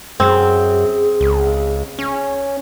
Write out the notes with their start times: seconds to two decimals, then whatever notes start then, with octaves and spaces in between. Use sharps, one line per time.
0.20 F#2 C4 G#4
1.21 C#2
1.99 C#4